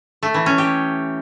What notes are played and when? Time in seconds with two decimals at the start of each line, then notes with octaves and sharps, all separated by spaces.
0.23 A3
0.34 E3
0.46 C#4
0.58 G4